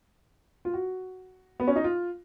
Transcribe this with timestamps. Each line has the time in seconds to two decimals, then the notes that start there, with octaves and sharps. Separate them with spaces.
0.65 F4
0.74 F#4
1.60 B3
1.68 C#4
1.76 D#4
1.84 F4